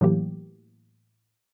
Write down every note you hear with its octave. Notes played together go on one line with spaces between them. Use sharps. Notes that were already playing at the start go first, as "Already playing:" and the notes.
A2 E3 F#3 A#3 G4